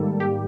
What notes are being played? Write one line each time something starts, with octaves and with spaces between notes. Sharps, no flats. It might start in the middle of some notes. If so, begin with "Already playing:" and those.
Already playing: G#2 D#3 G3 A#3 A4
G4